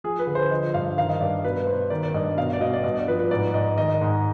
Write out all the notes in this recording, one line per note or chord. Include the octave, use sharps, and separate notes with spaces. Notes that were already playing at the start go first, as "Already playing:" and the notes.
F3 G#4
B4
D3
C5
F3 D#5
G2 F5
D#3 F5
D#5
G2 D5
B2 B4
B2 C5
D#3 D5
D5
G2 D#5
B2 F5
D5
B2 D#5
D5
G2 D#5
D5
F3 B4
B4
G#2 D5
G#2 D#5
D#3 D#5
G#2